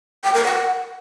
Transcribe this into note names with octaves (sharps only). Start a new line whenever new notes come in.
G5
A#4
F#5